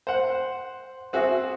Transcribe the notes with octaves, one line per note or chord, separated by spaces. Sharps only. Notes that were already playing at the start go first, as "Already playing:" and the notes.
C5 F#5
C4 F#4 G#4 E5